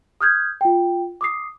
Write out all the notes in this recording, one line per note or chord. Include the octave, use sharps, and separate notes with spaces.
D#6 F6 G6 G#6
F4 G5
D6 D#6 C7